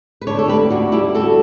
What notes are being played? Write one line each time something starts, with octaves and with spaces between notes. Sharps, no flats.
B4
D3 A4 C#5
A4
D2 G4 B4
D2 D4 F#4
G3 E4 G4
D3 F#4 A4